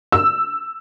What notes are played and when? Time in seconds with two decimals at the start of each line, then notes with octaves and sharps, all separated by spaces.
0.12 E6